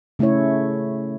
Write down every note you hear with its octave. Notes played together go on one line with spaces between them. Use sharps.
C#3 A3 C#4 E4 C#5